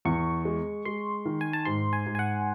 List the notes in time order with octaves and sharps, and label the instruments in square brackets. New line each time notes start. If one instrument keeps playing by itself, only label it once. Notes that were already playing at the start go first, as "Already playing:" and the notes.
[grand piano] E2 [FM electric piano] C#6
[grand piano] G#3
[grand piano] G#3 [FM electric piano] C6
[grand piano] D#3
[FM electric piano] G#5
A5
[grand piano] G#2 [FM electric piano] C6
[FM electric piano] G#5
[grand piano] G#2
[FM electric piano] G#5
F#5